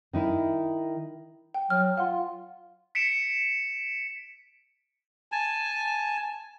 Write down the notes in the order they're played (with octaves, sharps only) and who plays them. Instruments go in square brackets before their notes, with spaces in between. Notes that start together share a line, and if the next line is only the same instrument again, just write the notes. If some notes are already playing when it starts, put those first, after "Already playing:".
[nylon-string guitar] D#3 D#4 E4
[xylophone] G5
[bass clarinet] F#3 [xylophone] F6
[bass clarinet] F4 [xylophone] F5 F#5 C6
[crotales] B6 C#7 D7 E7
[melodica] G#5 A5